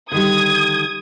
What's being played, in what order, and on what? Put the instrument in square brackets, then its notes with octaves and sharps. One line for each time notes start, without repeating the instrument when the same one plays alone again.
[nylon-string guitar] D3 D#3 G3 [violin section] D#6 G#6